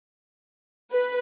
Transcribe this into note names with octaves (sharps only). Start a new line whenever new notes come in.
B4